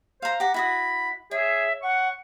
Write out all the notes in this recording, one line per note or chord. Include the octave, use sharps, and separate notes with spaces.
C5 F5 A#5
G4 F#5 A#5
E4 F#4 B5 D#6
G#4 C#5 E5
F#5 C#6